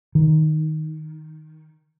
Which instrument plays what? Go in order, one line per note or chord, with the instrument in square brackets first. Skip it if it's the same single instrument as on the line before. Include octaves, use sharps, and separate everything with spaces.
[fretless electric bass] D#3